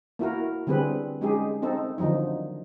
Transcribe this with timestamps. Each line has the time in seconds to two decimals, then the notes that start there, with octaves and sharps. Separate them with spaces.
0.19 A#3 E4 F#4 A#4
0.67 D3 G3 C4 G#4 B4
1.21 G#3 C#4 D#4 G4 G#4
1.62 C4 D#4 A4
1.98 D3 D#3 F3 F#3 D#4